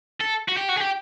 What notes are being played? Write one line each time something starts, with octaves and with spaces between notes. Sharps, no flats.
A4
F#4
G4
F#4
G#4
G4